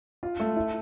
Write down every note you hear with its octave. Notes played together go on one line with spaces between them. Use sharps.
F4
A3
E4